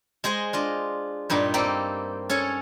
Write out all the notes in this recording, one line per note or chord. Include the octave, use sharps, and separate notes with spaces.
G#3 G#4 C5 D#5
D4 F4 D#5
G2 A#2 G3 D#4
A#3 C4 G4 A4
C#4 A4 C#5